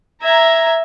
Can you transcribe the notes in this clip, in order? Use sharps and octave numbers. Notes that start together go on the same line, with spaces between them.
E5 A#5 G#6